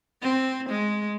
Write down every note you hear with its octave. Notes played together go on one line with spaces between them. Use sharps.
C4
G#3